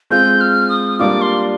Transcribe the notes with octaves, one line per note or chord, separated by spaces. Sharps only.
G#3 C4 F4 G6
F6
D#6
G3 A#3 D4 F4 D6
C6